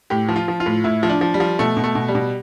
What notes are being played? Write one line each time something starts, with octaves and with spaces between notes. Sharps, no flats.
A2 G4
F3
F4
F3
F4
A2
A2 E4
F3
D4
F3
G3
F3
B2 A3
B2
A3
B2
G3
B2